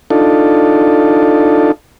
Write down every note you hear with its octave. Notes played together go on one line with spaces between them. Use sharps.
D4 D#4 F4 A4